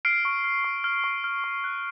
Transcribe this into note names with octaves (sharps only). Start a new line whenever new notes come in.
F6 C7 D7
C#6
F6
C#6
F6
C#6
F6
C#6
F#6